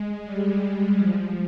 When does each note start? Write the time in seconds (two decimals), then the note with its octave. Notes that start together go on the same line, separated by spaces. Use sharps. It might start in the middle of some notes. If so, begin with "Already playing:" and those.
Already playing: G#3
0.25 G3
0.97 F3